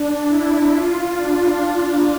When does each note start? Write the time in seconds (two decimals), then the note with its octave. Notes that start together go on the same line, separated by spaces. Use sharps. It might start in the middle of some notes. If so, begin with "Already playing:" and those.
Already playing: D4
0.28 E4
0.71 F4
1.14 D4